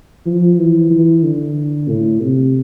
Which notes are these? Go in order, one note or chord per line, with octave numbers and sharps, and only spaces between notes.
F3
E3
E3
D3
A2
C3